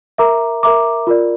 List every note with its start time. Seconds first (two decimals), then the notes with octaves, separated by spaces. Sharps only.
0.18 A#4 E5 A#5 D6
0.63 A#4 E5 A#5 D6
1.07 F4 A#4 D5